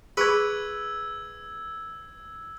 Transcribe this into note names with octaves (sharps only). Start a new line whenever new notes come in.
G#4 B4 B5 C#6 E6 G#6